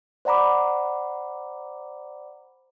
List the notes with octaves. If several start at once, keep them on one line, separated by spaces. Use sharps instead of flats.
C5 D5 F#5 A#5 B5 D6